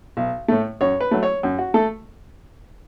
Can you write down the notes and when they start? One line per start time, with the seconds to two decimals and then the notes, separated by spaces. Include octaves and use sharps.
0.17 B1
0.48 A2 A3
0.81 F#2 C#5
1.01 B4
1.11 F#3 A3
1.23 C#5
1.43 F#2
1.59 F#4
1.74 A3 A4